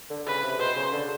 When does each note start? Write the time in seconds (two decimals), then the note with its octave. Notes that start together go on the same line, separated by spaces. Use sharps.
0.10 D3
0.26 C#3 B4
0.43 C3
0.59 B2 C5
0.76 C#3
0.92 D3